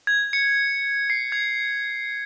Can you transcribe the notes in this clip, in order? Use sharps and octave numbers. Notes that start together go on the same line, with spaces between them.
G#6
C#7
C7
G#6